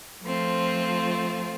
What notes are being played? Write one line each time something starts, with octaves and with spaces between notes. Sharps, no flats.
F3 A3 C4 F4